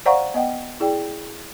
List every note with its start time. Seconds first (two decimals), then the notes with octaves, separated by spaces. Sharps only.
0.06 C5 D5 F5 F#5 A#5 C#6
0.34 B3 D#5 F#5 G5
0.80 E4 G#4 D5 G5